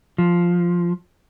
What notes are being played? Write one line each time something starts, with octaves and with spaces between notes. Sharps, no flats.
F3